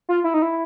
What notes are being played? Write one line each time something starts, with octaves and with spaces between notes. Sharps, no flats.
F4
E4
D#4
E4